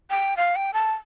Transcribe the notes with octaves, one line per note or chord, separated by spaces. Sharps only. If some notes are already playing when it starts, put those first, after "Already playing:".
G5
F5
G5
A5